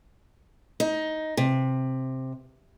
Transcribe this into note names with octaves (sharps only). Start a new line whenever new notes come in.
D#4
C3